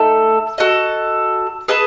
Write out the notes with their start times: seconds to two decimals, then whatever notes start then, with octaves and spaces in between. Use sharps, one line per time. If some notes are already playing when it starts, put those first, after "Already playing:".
Already playing: A3 D#4 A4
0.58 F#4 A4 D#5
1.68 G#4 B4 D#5 A5